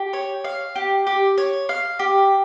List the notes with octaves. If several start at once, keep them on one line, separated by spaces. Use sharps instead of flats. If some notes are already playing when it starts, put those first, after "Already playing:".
Already playing: G4
C#5
F5
G4
G4
C#5
F5
G4